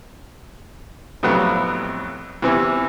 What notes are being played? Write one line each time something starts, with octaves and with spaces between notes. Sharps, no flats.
F2 A2 C3 F#3 G3 B3
E2 C3 E3